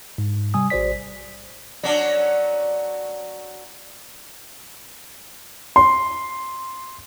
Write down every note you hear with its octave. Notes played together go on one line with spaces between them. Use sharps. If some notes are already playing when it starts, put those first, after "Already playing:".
G#2
C3 G3 G#5 D#6
A1 F#4 C5 D5 B6
F#3 C#4 D4 D5 F#5
C6